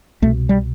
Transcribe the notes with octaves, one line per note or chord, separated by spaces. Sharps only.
C2 B2 A3
G3